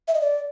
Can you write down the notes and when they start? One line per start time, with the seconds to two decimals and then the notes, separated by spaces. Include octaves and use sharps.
0.08 E5
0.14 D#5
0.21 D5